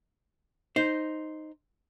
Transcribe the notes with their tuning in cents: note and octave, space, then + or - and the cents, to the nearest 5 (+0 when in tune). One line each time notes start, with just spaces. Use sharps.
D#4 +0 C5 +0